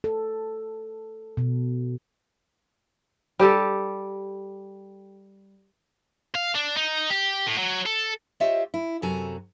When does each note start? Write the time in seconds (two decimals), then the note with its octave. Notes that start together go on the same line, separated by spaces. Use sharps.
0.04 A4
1.37 B2
3.39 G3 G4 A4
6.35 F5
6.55 D4
6.76 D#4
7.10 G4
7.46 A2
7.58 F#3
7.86 A4
8.40 F4 G4 C5 C#5 D#5 E5
8.74 E4
9.02 F#2 C3 F#4 A4 G#5 A#5